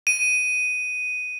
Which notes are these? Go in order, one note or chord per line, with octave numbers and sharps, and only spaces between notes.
D#7